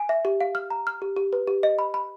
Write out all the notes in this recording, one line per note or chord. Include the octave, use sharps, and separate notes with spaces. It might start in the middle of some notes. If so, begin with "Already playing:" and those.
Already playing: G#5
E5
G4
F5
F6
A#5
F6
G4
G4
B4
G4
D#5
B5
B5